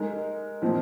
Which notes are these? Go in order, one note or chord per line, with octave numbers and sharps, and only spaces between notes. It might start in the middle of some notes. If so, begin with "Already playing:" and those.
Already playing: G#3 D#4 A#4
A#2 F3 C4